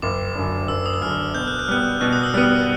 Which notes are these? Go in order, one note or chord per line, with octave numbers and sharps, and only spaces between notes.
F#1 D6
F#2 D3
F#1 E6
D#6
E6
F#2 D3 F6
B2 G6
F#6
F6
G3 B3 F#6
B2 F#6
D#6
E6
G3 B3 F6